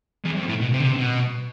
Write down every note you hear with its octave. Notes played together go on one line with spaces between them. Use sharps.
E2
F2
A2
B2
C3
D3
C3
B2